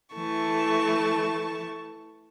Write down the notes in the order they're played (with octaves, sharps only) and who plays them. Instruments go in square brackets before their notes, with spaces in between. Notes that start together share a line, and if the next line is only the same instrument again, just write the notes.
[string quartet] E3 A3 A5 C#6